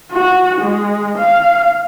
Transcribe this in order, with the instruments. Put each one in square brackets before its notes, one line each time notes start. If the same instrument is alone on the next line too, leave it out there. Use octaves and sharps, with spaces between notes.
[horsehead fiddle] F#4
G#3
F5